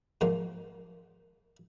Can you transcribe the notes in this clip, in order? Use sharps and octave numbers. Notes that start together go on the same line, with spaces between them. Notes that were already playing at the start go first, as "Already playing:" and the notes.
G#2 D#3 F3 F#3 A#3